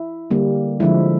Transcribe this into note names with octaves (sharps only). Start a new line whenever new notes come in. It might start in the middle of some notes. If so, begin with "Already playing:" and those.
Already playing: E4
D3 G3 A#3
D3 F3 G#3 E4